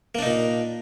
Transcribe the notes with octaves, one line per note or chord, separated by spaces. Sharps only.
A#2 A#3 D4 D#4